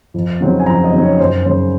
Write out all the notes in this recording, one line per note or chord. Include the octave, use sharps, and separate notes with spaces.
F2
C#3 F#3 C4 D#4
G#5
F2 A#5
D#5
C#3 F#3 C4 D#4
C#5
F#2 C5
C#3 F#3 C5